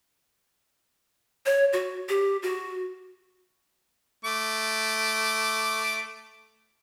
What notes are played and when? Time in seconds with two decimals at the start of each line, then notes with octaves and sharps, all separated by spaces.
1.46 C#5
1.73 F#4
2.09 G4
2.43 F#4
4.25 A3 D6